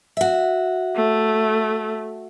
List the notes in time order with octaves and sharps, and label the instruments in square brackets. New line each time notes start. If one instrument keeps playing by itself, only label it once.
[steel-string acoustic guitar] F#4 E5
[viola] A3